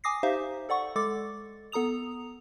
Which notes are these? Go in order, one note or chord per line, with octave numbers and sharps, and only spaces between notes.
G#5 D6 D#6 A#6 C7
D#4 G4 C5 E5 F5
A4 D5 F#5 C#6
G#3 A4 D6 A6
B3 A4 A#5 D#6 F7